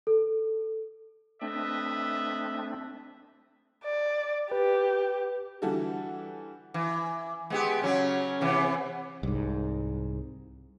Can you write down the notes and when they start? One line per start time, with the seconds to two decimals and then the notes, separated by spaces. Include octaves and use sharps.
0.07 A4
1.41 A3 C4 D4 B4 D#5 E5
3.84 D5
4.51 G4 B4
5.62 D3 E3 G3 F#4 A4
6.74 E3
7.50 G#3 B3 G4
7.82 C#3 F#3 C#4
8.41 C3 E3 B3
9.23 C2 G#2